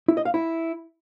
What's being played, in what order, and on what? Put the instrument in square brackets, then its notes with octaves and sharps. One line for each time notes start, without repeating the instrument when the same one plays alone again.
[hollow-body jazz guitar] E4
D#5
F5
E4